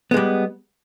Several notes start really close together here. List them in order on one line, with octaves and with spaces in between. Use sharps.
B3 G#3 G3